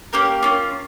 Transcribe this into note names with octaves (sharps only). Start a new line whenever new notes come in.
A#3 C#4 G4 A#4
A#3 C#4 F4